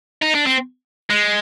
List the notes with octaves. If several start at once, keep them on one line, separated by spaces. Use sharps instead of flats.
D#4
D4
C4
G#3